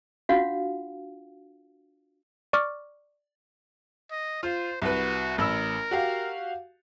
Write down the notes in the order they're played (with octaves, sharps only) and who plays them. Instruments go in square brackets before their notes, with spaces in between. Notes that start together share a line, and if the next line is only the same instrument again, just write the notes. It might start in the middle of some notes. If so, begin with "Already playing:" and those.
[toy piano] D4 F4 F#4 F5 F#5
[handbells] D5 C#6 D6 F6
[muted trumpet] D#5
[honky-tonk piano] F4 [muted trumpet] C5
[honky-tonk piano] C2 B4 [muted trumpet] F#4
[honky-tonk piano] A1 B5 E6 [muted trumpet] A#4
[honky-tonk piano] F#4 G4 F5